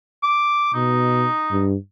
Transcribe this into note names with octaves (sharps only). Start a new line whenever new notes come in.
D6
B2 D#4
G2